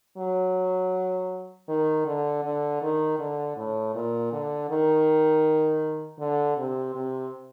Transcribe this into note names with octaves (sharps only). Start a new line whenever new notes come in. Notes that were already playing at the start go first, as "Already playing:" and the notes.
F#3
D#3
D3
D3
D#3
D3
A2
A#2
D3
D#3
D3
C3
C3